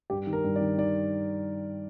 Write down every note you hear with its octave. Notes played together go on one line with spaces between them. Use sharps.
G2 G4
D#3
A#4
G2
D5
D#3
D#3 D5